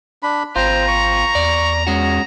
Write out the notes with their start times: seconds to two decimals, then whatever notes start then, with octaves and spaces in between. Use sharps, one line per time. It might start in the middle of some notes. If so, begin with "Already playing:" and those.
0.23 D4 B5
0.56 G#1 C4 F4 C5 A#5
0.88 C#6
1.35 E2 D5
1.87 G#3 C#4 F#4